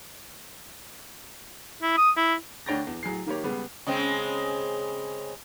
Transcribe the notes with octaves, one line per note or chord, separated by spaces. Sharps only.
E4
D#6
E4
D2 D4 C#5 G5 A6 A#6
E2
A2 F#3 G#4 C7
D#3 A#3 G4 C#5
C#2 C#3 G3 B3
C#3 G#3 C4